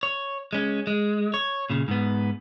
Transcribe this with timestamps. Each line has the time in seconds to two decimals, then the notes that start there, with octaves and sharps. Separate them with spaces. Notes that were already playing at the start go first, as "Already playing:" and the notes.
0.03 C#5
0.53 G#3 C#4
0.87 G#3
1.34 C#5
1.70 A#2 C#3
1.88 G#2 B3